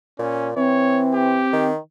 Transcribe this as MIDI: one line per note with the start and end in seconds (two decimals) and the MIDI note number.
0.19 0.53 46
0.19 0.49 61
0.56 1.45 52
0.56 1.70 60
0.56 1.03 73
1.13 1.69 67
1.53 1.77 51